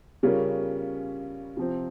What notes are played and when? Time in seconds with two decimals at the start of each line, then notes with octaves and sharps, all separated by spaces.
0.23 C#3 G3 C#4 F4 A#4
1.57 C3 F3 C4